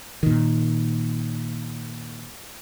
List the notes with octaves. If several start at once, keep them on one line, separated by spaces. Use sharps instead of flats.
A#2 D#3